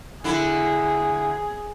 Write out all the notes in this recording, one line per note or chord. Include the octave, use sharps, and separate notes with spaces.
D3 E4 G#4